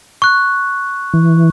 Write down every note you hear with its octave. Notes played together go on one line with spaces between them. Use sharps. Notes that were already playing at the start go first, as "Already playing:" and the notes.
C#6 F#6
E3